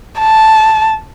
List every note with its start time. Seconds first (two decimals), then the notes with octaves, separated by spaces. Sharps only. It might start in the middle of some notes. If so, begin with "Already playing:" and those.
0.20 A5